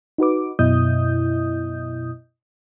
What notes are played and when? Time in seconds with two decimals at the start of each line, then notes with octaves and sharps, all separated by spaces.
0.18 D#4 F#4 B4 D6
0.59 F#2 B2 E4 D#5 D#6 G6